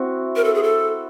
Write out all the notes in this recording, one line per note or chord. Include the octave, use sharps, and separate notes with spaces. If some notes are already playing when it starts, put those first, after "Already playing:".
Already playing: C4 E4 F#4
A#4
A4
G#4
A4